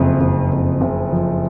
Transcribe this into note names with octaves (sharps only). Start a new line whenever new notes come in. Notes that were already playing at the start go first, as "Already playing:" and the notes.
Already playing: F#1 F2
F#1
F2
F#1
F3